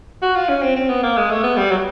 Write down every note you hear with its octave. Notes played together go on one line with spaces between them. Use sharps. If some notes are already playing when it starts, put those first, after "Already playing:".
F#4
F4
C#4
C4
C4
B3
A#3
G#3
A3
B3
G3
F#3